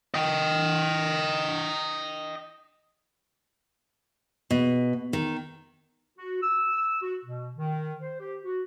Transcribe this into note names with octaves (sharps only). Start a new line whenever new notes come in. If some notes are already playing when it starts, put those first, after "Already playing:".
D#5 G5
B2
D#3
F#4
E6
F#4
B2
D#3
C5
G4
F#4